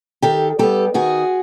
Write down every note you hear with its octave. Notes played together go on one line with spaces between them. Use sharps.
D#3 G4 A4
G3 B3 G4 A4
D#3 F#4 G#4